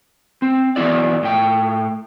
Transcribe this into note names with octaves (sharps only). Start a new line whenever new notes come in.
C4
E3 F#3 B3 E4 D5
A2 G5